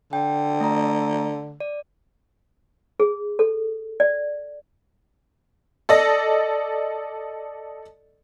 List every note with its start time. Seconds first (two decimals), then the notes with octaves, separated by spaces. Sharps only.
0.13 D3 G5
0.61 A3 A#5
1.60 D5
3.00 G#4
3.39 A4
4.00 D5
5.89 A4 D5 D#5 A#6